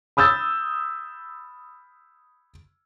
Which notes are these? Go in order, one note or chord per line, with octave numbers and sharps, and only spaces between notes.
B5 D#6 E6 G6 A6